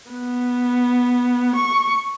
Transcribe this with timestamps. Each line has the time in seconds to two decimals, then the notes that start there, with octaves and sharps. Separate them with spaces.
0.11 B3
1.56 C#6